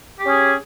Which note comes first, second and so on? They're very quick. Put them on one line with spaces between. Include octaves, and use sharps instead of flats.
G4 C#4 G#4